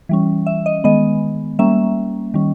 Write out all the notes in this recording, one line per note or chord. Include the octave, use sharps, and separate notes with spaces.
E3 G3 C#4
E5
D#5
D#3 G#3 B3 D#5
G3 A#3 C#4 E5
D#3 G3 C#4